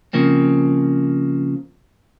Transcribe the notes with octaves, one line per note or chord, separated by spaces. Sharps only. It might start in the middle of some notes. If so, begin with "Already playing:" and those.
C#3 F3 A#3 C4